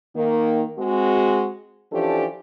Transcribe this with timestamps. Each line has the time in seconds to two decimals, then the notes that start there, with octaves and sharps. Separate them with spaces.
0.15 D#3 A#3
0.78 G#3 C4 F#4
1.93 E3 F3 C#4 D4 G4 A4